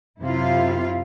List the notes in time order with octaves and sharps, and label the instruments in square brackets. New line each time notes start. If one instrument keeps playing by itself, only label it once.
[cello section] F#2 C3 E4 F4 F5